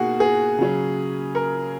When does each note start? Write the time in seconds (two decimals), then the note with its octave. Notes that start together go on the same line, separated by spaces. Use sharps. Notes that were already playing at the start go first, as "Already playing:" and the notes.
Already playing: B2 A#3 D#4 F#4 G#4
0.20 G#4
0.59 C#3 F#3 C#4
1.35 A#4